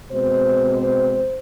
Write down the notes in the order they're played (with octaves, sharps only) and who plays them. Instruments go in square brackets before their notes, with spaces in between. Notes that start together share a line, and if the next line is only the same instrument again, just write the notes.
[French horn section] B2 G#3 C4 C5